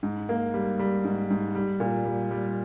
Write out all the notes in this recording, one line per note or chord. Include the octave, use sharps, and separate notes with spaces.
G#2
A#3
G3
G3
G#2
G#2
G3
A#2
G3
G3